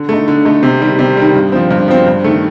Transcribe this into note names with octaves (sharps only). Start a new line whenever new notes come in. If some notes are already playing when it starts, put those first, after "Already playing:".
Already playing: D3
A3 D#4
D3
A3 D#4
C3
D#3 G3
C3
D#3 G3
G2
F3 C4
G2
F3 C4
G2
D#3 A3